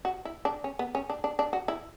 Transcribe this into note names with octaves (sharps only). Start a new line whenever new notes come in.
F#4
E4
D4
C#4
B3
C#4
D4
D4
D4
F#4
E4